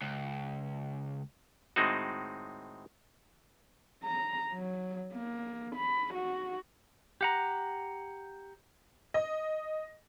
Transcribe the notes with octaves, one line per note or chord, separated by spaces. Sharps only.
C#2
A2 D#3 G#3 C4 D#4 F#4
A#5
F#3
A#3
B5
F#4
G4 F#5 A#5
D#5